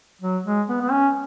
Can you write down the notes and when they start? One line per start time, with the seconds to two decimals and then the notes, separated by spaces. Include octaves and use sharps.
0.22 F#3
0.45 G#3
0.69 B3
0.81 B3
0.91 C#4